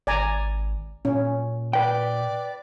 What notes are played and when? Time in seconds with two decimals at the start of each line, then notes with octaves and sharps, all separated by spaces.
0.07 G#1 D5 G#5 A#5
1.05 A#2 C#4
1.73 B4 D5 G5